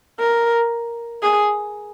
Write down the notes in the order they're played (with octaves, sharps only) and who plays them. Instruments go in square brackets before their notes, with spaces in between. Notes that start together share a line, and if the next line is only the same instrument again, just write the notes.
[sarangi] A#4
G#4